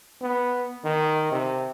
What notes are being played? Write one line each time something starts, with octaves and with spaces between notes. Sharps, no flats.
B3
D#3
C3